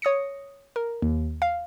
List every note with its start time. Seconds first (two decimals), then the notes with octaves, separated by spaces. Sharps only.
0.02 C#5 D#6 A#6 C#7
0.76 A#4
1.02 D#2
1.42 F5